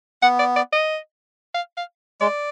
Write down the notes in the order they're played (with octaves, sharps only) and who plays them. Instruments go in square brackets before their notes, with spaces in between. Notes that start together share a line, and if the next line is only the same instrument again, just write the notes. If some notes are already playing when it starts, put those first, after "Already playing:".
[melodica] B3 [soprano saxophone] F#5
[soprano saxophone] D5
D5
D#5
F5
F5
[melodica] G#3 [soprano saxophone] D5